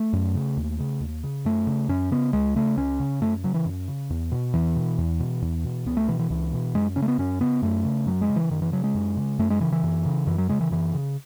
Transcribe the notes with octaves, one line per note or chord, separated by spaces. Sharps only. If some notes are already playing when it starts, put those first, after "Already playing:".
Already playing: A3
F#2
C#3
D#2
C#3
D#2
C#3
F#2 A3
C#3
F#2 C#4
C#3 B3
C#2 G#3
C#3 A3
C#2 C#4
C#3
F#2 A3
C#3 F#3
E3
F#2
C#3
E2
B2
E2 E3
B2
E2
B2
E2
B2
C#2 B3
A3
B2 E3
E3
C#2 E3
B2
F#2 G#3
C#3 C#4
A3
B3
F#2 C#4
C#3 B3
F#2 A3
C#3
F#2 F#3
G#3
C#3
E3
F#2 D#3
E3
C#3 F#3
G#3
F#2
C#3
F#2 A3
G#3
C#3 E3
E3
F#2
C#3
F#2 E3
F#3
C#3 G#3
E3
F#2 E3
C#3